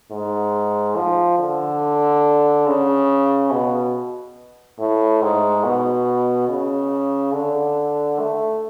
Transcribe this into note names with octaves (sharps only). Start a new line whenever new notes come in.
G#2
F3
D3
C#3
B2
A2
G#2
B2
C#3
D3
A3